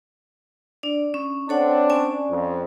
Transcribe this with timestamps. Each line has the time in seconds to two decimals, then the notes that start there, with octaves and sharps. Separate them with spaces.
0.83 D4 D5
1.14 C#4
1.49 C4 D4 A4 C#5 F#5
1.90 C#4 D5 G#5
2.31 F2